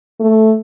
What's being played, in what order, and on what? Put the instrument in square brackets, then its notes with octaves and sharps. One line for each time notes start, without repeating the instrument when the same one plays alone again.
[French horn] A3